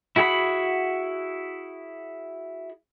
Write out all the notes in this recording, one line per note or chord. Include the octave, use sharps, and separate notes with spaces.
E4 F#4 G#4 F#5 B5